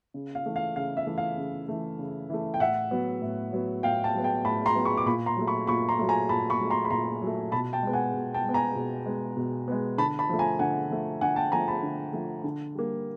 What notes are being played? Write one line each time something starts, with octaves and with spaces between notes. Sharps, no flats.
C#3
F5
E3 A3
F5
C#3 F5
E5
E3 A3
F5
C#3
E3 A3
C#3
E3 A3
G5
A2 E5 F#5
F#3 B3
A2
F#3 B3
A2 F5 G5
G5 A5
F#3 B3
G5 A5
A2 A5 B5
A#5 C6
F#3 B3
B5 C#6
D6
A#2 B5 C#6
A#5 C6
F#3 A3
B5 C#6
A#2 B5 C#6
A#5 C6
F#3 A3
G#5 A#5
A#2 A5 B5
B5 C#6
F#3 A3
A#5 C6
B5
A#2 A#5 C6
F#3 A3
B2 A5 B5
G5 A5
G#3 B3
F#5 G#5
B2
G5 A5
G#3 B3
G#5 A#5
B2
G#3 B3
B2
G#3 B3
D3 A5 B5
A5 B5
F3 A3
G#5 A#5
D3 F#5 G#5
F3 A3
D3 F#5 G#5
G5 A5
F3 A3 G#5 A#5
A5 B5
D3
F3 A3
D3
G3 A#3